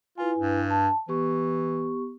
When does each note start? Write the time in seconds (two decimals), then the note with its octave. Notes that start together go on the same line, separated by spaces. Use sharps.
0.18 E4 F4 B4 G#5
0.39 G2
0.70 A5
1.08 E3 B3 G4 C#6